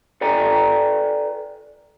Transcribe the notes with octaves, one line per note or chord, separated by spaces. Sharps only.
A4 B4 D5 G5 G#5 A#5